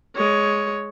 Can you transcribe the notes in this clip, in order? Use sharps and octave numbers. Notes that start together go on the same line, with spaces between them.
G#3 C#5